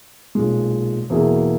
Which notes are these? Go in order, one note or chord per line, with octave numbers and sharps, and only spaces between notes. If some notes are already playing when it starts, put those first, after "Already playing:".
B1 A#2 G#3
E2 B2 A#3 E4 G#4